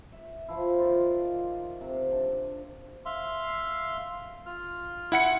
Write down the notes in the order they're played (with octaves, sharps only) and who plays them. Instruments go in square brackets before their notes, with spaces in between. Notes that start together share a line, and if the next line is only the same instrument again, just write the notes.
[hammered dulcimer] E5
F3 E4
D#3 F4 D5 C6
C3
D4
[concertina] E5 F5 C6
F4 F6
[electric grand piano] E4 F#5 C#7